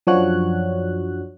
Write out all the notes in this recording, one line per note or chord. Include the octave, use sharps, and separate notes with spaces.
F#2 F3 D4 F#4 C#5 F#6